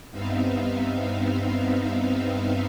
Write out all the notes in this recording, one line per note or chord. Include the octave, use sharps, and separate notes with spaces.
G2 B3 C4 D#4 E5 F5